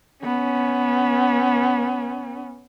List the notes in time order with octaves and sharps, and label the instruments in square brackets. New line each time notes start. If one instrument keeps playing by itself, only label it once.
[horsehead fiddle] B3 C#4